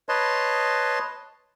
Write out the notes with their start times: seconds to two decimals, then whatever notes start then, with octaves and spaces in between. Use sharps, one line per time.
0.09 B4 C#5 D#5 A5 C6